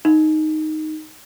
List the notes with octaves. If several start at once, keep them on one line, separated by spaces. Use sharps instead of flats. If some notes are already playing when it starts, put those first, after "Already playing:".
D#4